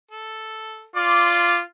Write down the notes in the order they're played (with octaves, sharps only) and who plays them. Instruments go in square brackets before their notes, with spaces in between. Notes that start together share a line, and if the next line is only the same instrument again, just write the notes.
[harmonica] A4
[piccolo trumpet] F4 [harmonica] D5 C6 D6